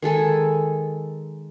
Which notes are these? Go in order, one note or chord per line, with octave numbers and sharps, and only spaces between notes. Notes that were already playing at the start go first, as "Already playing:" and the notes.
D#3 G#3 A4 G#5